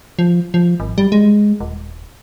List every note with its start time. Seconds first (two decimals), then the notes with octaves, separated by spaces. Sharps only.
0.19 F3
0.54 F3
0.80 G#1
0.98 G3
1.12 G#3
1.60 D#1